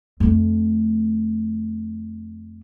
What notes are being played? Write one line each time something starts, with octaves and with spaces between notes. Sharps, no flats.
F2 A3